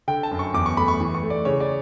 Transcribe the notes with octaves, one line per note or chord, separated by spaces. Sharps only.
D3 G5
A5
F#2
C#6
E2 D6
C#6
A3 B5
C#6
E3
C#6
A3
D5
C#3 C#5
D5